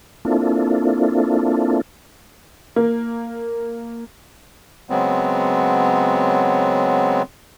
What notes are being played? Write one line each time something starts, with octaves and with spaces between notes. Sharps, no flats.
A#3 C4 D4 E4 F4 A4
A#3
C#3 F#3 G#3 B3 C4